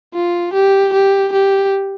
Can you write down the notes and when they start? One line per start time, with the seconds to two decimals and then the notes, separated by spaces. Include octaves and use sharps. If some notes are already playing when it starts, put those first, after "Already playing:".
0.14 F4
0.54 G4
0.94 G4
1.33 G4